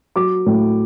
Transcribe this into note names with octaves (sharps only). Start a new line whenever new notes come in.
F#3 D6
A2